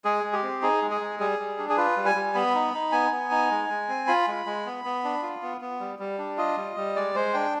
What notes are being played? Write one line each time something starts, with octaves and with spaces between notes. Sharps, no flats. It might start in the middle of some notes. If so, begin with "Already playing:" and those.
G#3 G#4
G#3
G4
C4
D#4 G#4
G#3
G#4
G#3
G3 G#4
G3
D4
G#4
F4 B4
G3
G#5
G3
B3 B5
D#4
D#4
B3 G#5
B3
D#4
G#3
G#3
C4
F4 B5
G#3
G#3
B3
B3
D4
F4
B3
B3
G3
G3
D4
F4 D#5
G3
G3
G#3 D5
G#3 C5
D4 G5